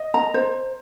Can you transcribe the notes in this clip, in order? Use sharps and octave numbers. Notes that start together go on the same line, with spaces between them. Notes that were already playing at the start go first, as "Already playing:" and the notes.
Already playing: D#5
A#5
C5